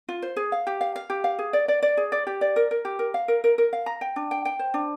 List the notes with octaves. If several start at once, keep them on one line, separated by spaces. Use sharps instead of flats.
F4
C5
G#4
F5
G4
F5
F5
G4
F5
G#4
D5
D5
D5
G#4
D5
G4
D5
A#4
A#4
G4
A#4
F5
A#4
A#4
A#4
F5
A#5
G5
D4
G5
G5
C5
D4